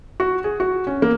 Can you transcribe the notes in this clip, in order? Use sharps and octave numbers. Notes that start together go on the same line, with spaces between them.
F#4
G#4
F#4
C#4
A#3